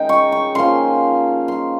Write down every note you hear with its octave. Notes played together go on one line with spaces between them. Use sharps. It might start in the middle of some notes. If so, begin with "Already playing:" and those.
Already playing: D#3 G#3 C#4 D#4 G5
C#6
C#6
F3 A#3 C#4 C6
C6